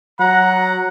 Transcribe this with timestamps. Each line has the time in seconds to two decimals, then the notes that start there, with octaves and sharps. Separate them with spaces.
0.20 F#3 F#5 A#5